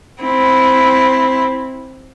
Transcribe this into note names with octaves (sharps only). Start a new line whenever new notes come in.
C4 E4